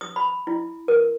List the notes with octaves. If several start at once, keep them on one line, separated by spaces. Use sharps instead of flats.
D#6
B5
E4
A#4